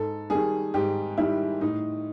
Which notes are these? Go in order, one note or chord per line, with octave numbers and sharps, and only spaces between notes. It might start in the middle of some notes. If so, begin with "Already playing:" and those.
Already playing: G#2 A4
D#3 G3 G#4
G#2 G4
D#3 G3 E4
A2 D#4